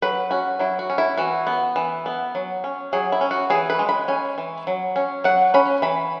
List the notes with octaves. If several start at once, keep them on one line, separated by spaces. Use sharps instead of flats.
F#3 B4
C#4 F#4
F#3 E4
F#4
C#4
E4
E3 F#4
B3
E3
B3
F#3
C#4
F#3 G#4
E4
C#4
F#4
E3 G#4
B4
G#3
B5
C#4 G#5
E3
F#3
C#4
F#3 F#5
C#4 B5
E3 B5